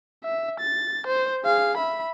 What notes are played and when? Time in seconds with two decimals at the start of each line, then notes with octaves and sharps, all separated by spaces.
0.24 E5
0.60 A6
1.07 C5
1.44 G#4 F5
1.77 E5 B5